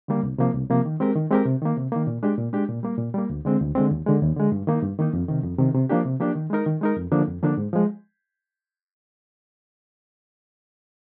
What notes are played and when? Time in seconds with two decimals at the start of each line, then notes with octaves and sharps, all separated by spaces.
0.08 D3 G3 A#3
0.23 C2
0.38 C3 F3 A#3
0.54 C2
0.70 C3 F3 A#3
0.85 D#3
1.00 G#3 C4 G4 A#4
1.15 D#3
1.31 G#3 C4 G4 A#4
1.45 C3
1.62 D#3 A#3
1.77 C3
1.92 D#3 A#3
2.07 A#2
2.23 G#3 D4 G4
2.38 A#2
2.53 G#3 D4 G4
2.69 A#2
2.83 G3 A#3
2.98 A#2
3.14 G3 A#3
3.30 D2
3.45 D3 G#3 C4
3.61 D2
3.75 D3 G#3 C4
3.91 D#2
4.06 D3 G#3
4.21 D#2
4.37 D3 G#3
4.52 G2
4.67 D#3 A#3 D#4
4.82 G2
4.98 D#3 A#3 D#4
5.13 F2
5.28 C3 D#3
5.44 F2
5.58 C3 D#3
5.75 C3
5.89 F3 A#3 D4 G4
6.05 C3
6.20 F3 A#3 D4 G4
6.36 D#3
6.50 G#3 D#4 A#4
6.66 D#3
6.81 G#3 D#4 A#4
6.96 F2
7.12 D3 F3 A#3 D4
7.28 F2
7.43 D3 F3 A#3 D4
7.57 G#2
7.73 F3 G#3